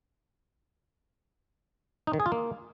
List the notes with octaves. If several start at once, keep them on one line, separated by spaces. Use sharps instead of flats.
D#4
D#3
G#4
F4
A#3